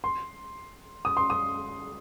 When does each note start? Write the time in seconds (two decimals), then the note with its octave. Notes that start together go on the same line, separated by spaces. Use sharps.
0.04 C6
1.05 D#6
1.17 C6
1.30 D#6